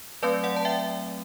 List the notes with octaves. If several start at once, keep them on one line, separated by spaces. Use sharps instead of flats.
F#3 A3 C4 B4 D5
D5 F#5
A5
E5 G5